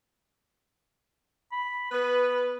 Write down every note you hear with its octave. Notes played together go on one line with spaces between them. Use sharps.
B5
B3 B4